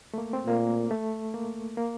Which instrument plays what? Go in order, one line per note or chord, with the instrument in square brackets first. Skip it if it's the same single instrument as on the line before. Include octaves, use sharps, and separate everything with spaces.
[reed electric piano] A3
A#3
C4
[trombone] A#2 [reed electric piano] A#3
[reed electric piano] A3
A#3
A#3